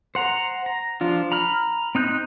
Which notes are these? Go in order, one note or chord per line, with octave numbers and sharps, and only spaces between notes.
C5 F#5 A#5
A#5
F3 D4 F4
A#5 B5 F6
C4 D#4 F#6 G6